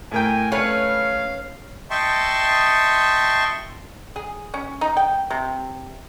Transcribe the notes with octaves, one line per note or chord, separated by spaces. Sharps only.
A2 A#4 G5 G#5
A3 C#4 B4 C#5 F5
D#5 E5 G5 A5 C6 C#6
G#4
C#4
D#4
G5
C3